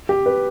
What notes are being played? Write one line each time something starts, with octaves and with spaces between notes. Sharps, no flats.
G4
B4